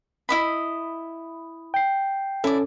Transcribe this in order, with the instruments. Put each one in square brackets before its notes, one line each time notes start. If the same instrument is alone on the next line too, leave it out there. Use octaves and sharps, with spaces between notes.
[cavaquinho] E4 D#5 B5
[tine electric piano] G5 C7
[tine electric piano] C#4 A4 [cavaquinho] E4 D5